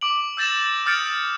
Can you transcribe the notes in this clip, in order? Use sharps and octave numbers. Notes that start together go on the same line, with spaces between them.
D6 D7 F#7
E6 G6 A6 A#6 E7
D#6 F6 G6 A6 C#7 D7